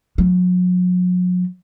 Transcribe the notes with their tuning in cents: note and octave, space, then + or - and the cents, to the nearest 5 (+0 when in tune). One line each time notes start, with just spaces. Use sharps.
F#3 -40